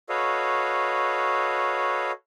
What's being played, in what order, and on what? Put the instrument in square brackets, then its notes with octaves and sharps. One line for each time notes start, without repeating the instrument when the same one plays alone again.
[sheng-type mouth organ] F#4 A4 B4 C#5 D#5 F5